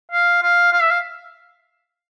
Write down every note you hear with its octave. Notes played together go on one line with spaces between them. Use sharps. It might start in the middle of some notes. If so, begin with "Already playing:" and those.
F5
F5
F5
E5
F5